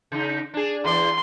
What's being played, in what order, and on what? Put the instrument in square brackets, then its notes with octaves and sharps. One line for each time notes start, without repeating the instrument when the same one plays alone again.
[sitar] C#3 D#4
D4 G#4
[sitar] E2 D5 [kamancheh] C6